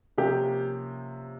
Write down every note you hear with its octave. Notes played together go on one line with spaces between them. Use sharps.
C3 F3 A#3 C#4 G4